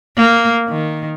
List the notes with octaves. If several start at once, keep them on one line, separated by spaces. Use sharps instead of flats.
A#3
D#3